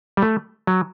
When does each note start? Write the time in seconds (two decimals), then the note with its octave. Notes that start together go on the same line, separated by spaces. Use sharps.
0.17 G3
0.22 A3
0.67 F#3